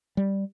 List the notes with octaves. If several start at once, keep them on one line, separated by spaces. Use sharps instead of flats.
G3